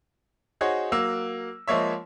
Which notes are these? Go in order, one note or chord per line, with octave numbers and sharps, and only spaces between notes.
D#4 F#4 G#4 C5 C#5
F#3 A#3 E6
F3 G#3 A#3 C#5 E5